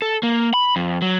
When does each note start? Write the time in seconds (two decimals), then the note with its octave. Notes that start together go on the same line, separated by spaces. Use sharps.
0.02 A4
0.23 A#3
0.54 B5
0.76 F2
1.02 F#3